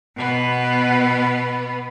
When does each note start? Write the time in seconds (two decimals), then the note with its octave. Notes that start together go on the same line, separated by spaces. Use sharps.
0.15 B2 B3